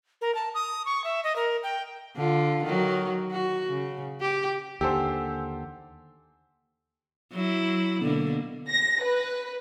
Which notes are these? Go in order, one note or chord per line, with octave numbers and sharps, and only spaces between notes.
A#4
A5
D#6
C#6
E5
D#5
A#4
G5
D3 F4
D#3 F#3
F#4
C#3
G4
D#2 D3 G4 A4 C5 F#5 G#5 E6
F#3 E4
B2 D3 A#3
A#6
B4